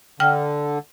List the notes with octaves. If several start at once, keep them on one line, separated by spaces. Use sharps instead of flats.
D3 G5 F6